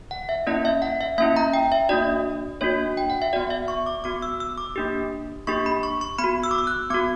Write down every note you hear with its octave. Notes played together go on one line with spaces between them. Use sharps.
F#5
E5
A#3 C#4 E4 D5
E5
F#5
E5
A#3 C#4 E4 E5
A#5
G5
E5
A#3 D4 F#4 D5
A#3 D4 F#4 C#5
G5
F#5
E5
B3 F#4 D5
E5
C#6
D6
B3 F#4 D6
E6
E6
D6
A#3 D4 G4
A#3 D4 G4 C#6
B5
C#6
C#6
B3 B5
F#4
E6
D6
E6
F#6
B3 F#4 D6